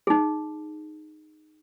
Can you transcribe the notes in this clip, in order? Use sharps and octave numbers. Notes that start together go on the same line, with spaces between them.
D#4 G#4